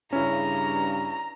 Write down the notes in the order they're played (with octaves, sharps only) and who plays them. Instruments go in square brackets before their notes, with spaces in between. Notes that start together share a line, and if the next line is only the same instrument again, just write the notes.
[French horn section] G2 C#3 [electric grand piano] C#4 E4 [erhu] A#5